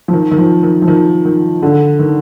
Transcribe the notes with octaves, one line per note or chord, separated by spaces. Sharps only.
F3
D#3
D#3
F3
D#3
F3
D#3
D#3
D3
D#3